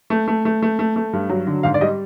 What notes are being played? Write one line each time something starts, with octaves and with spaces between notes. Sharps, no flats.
A3
A3
A3
A3
A3
A3
G2
F#3
D3
G#2 F5
D5
G3 D#5